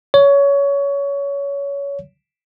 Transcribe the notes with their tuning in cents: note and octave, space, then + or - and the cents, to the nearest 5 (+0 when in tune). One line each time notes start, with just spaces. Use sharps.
C#5 +20